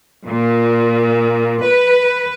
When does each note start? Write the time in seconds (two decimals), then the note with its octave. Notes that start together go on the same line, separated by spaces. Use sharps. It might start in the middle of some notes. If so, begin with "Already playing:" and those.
0.27 A#2
1.65 B4